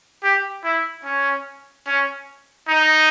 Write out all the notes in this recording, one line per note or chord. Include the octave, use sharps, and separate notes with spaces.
G4
E4
C#4
C#4
D#4